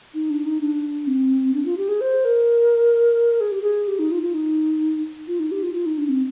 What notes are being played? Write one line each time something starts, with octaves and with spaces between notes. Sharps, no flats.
D#4
D4
D#4
D4
C4
D4
F4
G4
G#4
C5
A#4
G#4
G4
G#4
G4
D#4
F4
F4
D#4
F4
D#4
G4
F4
F4
D#4
D4
C4